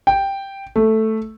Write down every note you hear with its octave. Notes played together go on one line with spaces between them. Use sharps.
G5
A3